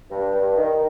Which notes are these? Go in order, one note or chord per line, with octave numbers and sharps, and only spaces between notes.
G2
G2
D#3